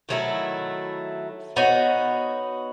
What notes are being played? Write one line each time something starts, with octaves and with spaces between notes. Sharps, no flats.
D#3 F#3 A3 E4
B3 D#4 F#4 C#5